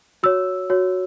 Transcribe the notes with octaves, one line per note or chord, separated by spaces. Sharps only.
F#4 C#5 E6
F#4 C#5